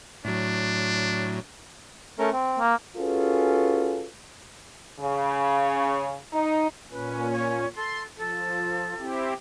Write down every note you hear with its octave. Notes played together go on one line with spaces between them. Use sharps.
A2 F#3 D4
A3 C#4 A#4
C4
A#3
C#4 F4 F#4 G#4 A4 B4
C#3
D#4
A#2 C#4 B4
C#5
A4 C6
F3 A4
C4 E4 G4